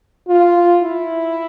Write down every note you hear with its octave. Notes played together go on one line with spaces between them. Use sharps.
F4
E4